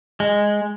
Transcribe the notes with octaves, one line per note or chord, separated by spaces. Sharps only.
G#3